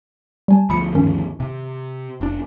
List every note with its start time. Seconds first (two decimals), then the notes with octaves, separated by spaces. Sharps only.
0.48 G3 G#5 A5
0.70 D2 F3 B5 D#6 C#7
0.95 G2 D#3 C#4
1.40 C3
2.21 F1 D4